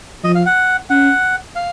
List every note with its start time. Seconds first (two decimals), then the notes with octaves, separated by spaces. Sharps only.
0.24 F3 D#5
0.35 F5
0.46 F#5
0.90 C#4 F#5
1.56 F5